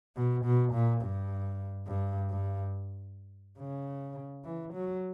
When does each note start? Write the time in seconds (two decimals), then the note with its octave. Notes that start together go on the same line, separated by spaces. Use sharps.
0.16 B2
0.45 B2
0.73 A#2
1.02 G2
1.87 G2
2.30 G2
3.59 C#3
4.45 E3
4.73 F#3